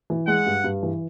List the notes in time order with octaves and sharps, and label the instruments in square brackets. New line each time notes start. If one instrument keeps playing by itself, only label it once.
[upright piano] E3
[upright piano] G#3 [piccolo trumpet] F#5
[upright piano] G2
G2
E3